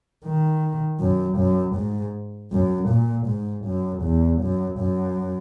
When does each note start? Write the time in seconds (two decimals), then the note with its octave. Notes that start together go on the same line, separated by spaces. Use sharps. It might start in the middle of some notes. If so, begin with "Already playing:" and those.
0.25 D#3
1.00 F#2
1.38 F#2
1.76 G#2
2.52 F#2
2.89 A#2
3.27 G#2
3.66 F#2
4.03 E2
4.41 F#2
4.79 F#2